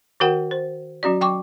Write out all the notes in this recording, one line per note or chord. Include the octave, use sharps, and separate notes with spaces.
D#3 F#4 A#4 F#5 G5
C5
F#3 C#4 F#4 D5
F#3 G5 C#6 D6